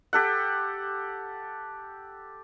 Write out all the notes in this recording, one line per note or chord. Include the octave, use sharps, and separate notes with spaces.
G4 A4 F#5